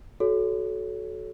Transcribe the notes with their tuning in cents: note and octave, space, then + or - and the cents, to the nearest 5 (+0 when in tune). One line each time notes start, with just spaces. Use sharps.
F#4 +0 A4 -30 C#5 +15